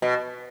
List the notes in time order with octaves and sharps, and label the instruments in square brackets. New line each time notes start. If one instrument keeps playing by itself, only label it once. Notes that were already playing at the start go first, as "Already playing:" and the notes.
[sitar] B2